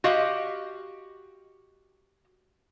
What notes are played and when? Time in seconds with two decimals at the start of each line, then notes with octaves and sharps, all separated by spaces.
0.04 F#4 G4 D#5 F5